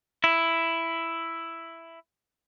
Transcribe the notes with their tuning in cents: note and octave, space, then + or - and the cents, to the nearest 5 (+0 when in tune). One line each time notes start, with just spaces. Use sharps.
E4 +5